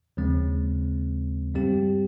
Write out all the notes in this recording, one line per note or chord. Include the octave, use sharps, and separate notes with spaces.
D#2 C#3 F3 G#3 C4
G2 G3 C4 G4